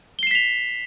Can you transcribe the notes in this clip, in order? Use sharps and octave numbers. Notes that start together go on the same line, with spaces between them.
B6 C7 E7 F7 G7